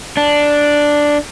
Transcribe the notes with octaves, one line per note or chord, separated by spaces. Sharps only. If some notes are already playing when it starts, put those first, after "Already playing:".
D4